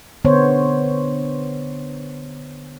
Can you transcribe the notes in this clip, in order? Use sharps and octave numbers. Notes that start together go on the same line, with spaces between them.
D3 B3 C5 C#5